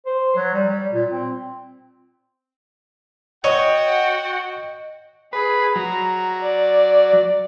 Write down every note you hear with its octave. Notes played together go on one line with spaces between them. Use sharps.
C5
F#3
G3
G3
A#2
C4
F#4 C#5 D#5 F#5 G5
G#4 B4
F#3 A#5
D5